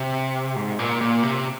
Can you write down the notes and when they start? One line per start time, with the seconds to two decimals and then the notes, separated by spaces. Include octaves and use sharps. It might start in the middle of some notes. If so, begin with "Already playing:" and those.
Already playing: C3
0.56 G#2
0.79 A#2
1.01 A#2
1.23 C3